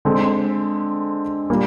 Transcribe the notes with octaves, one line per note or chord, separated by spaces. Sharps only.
D3 G#3 C4
A#2 G3 A#3